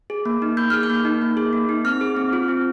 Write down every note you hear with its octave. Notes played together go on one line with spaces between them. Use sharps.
G#4
A#3
D#4
A#3 G6
G#4 F6
G6
A#3
D#4
A#3
G#4
A#3
D#4
C4 F6
G#4
C4
F4
C4